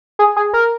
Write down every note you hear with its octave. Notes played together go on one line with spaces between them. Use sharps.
G#4
G#4
A#4